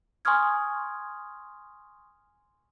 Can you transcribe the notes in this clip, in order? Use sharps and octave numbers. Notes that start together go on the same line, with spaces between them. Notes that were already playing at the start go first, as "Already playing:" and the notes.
G#5 C6 C#6 D#6 F6 G#6